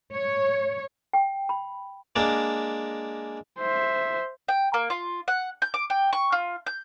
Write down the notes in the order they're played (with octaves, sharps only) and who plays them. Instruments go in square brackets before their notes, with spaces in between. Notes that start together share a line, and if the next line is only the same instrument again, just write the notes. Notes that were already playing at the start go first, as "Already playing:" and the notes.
[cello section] C#5
[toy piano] G5
B5
[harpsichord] G#3 A#3 D4
[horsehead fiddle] C5 E5
[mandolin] G5
A#3
F4
F#5
G6
D6
G5
C#6
F4
G6